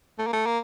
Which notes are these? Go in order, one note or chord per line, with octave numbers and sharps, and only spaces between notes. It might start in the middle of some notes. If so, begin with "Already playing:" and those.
A3
A#3
A3
A#3